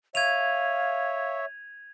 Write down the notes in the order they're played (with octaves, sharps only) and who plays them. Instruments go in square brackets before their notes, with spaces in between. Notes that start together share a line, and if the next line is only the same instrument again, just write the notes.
[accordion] C#5 E5 [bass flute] F5 [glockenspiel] G#6 D#7 F7